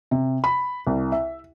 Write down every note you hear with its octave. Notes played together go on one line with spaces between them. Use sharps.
C3
B5
C2
E5